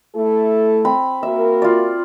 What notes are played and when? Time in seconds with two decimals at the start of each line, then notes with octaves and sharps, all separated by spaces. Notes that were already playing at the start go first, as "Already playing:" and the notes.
0.15 A3 E4 A4
0.85 C4 B5
1.23 A#3 F#4 A#4 E5
1.62 F4 D5